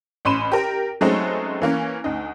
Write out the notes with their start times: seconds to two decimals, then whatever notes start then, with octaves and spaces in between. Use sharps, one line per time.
0.25 A1 C#4 B5 C6 D#7 E7
0.52 G4 A#4
1.01 F#3 G#3 A3 C4 C#4 D#4
1.62 E3 A#3 C#4
2.04 D2 D#4